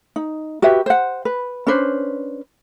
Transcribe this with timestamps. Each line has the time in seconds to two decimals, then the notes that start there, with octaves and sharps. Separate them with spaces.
0.16 D#4
0.62 F#4 G4 B4 E5
0.86 C5 F#5
1.25 B4
1.67 C#4 D4 B4 C5